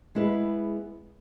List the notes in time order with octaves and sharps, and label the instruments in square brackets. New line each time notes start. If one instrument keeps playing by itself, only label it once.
[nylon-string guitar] G#3 B3 E4 G#4 B4